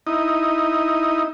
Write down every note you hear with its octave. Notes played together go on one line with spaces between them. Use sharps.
D#4 E4 D#5